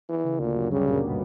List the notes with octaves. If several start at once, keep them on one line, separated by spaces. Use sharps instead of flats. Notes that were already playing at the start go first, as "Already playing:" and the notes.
E3
C#3
D2 A#2 D3
F#2 F#3
G2 C#3 G3
A#2 A#3
B2 B3